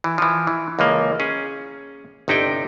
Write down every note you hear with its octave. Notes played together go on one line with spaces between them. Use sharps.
E3
E3 F3
E3
C#2 E3 F3 A#3
C#4 G#4
G1 C3 D#4 E4 D5 G5